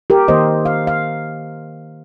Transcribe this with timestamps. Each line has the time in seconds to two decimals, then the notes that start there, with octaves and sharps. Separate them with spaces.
0.10 G4 A#4
0.28 D#3 A#3 C5 D#5
0.65 F5
0.87 F5